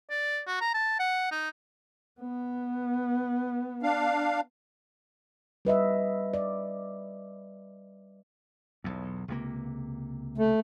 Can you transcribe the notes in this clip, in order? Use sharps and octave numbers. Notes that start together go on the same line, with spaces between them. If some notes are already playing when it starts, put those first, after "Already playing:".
D5
F#4
A#5
A5
F#5
D#4
B3
D4 F5
G3 B4 D#5 E5
D5
B1 E2
C#2 C3 A#3
A3